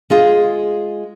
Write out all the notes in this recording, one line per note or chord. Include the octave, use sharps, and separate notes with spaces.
G#3 F4 G#4